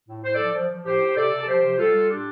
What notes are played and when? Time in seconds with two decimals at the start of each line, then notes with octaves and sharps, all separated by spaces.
0.08 A2
0.23 A2 C5
0.34 A4 D5
0.39 F3
0.55 F3
0.70 F3
0.85 A2 G4 C5
1.01 A2
1.16 C3 A4 D5
1.32 C3
1.42 A4
1.47 F3 G4 C5
1.63 C3
1.78 G3 F4 A4
1.93 G3
2.09 A2 D4 G4